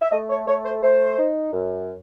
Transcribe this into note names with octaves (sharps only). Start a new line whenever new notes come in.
E5
A3 D#5
C#5
A3 C#5
C5
A3 C5
D#4
F#2